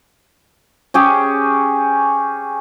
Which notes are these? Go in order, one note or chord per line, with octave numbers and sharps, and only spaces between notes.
C#4 G4 G#4